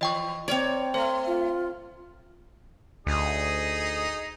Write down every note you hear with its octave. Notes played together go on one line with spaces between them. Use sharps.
E3 D#5 G5 C#6
C4 A#4 C#5 D5
A3 C5 C6
F4
D2 D#4 G#4